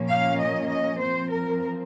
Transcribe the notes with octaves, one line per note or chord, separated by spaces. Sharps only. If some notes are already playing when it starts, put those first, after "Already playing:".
Already playing: A#2 F3 A#3 C#4
F5
D#5
D#5
F3 C4 C5
A#4